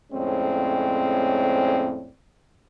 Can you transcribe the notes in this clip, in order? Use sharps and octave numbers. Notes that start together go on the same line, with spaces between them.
F2 A2 G#3 C4 C#4 D5